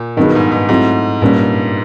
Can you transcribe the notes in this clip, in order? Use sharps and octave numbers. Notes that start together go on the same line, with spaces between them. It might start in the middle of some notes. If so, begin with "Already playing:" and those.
Already playing: A#2
G2 D#3 F#3 B3 D#4 G#4
G#2
G#2
G#2 F#3 A3 C4 E4
G2 A#2 G3 A#3 C#4